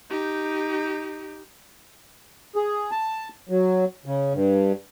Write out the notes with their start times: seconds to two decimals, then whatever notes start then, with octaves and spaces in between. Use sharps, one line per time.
0.10 D#4 G4
2.56 G#4
2.91 A5
3.49 F#3
4.06 C#3
4.33 G2